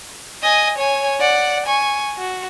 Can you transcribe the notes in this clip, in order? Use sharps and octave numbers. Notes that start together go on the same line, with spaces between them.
D#5 G#5
C#5 G#5
D5 F#5
G#5 C#6
F#4